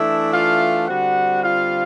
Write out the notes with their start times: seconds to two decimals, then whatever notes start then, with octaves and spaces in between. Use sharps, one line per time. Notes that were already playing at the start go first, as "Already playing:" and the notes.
Already playing: E3 A3 D4 E4 E5
0.33 F4 F5
0.88 D3 G3 C4 F#4 F#5
1.43 F4 F5